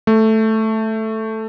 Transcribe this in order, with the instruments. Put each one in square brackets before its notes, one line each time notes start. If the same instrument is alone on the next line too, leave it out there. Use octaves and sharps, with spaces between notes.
[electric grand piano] A3